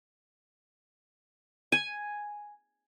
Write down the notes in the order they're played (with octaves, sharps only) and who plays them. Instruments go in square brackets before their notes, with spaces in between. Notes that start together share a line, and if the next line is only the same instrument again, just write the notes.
[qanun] G#5